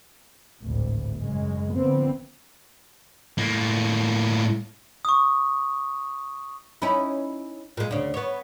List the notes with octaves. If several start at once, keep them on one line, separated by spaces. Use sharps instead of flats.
G#1 D2 A2
F#2 C#3 G#3
D3 F3 B3 C4
A2 A#3
C#6 D#6
C#4 D#4 E4
A#2 G#3
D2 C#3
B3 C#5